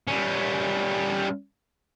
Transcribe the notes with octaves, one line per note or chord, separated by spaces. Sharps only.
G3 C#4